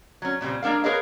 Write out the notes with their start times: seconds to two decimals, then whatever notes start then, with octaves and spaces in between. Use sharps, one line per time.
0.22 F#3 C#4
0.41 A#2 C#3 G3 C4
0.63 G#3 A#3 D4 A#4 F5
0.84 G#4 A#4 B4 C#5 D#5 F5